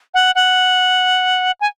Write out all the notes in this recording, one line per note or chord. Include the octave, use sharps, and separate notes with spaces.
F#5
F#5
G#5